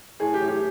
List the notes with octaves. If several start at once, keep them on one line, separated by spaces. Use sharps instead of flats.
A2 G#4
G4
A2
G4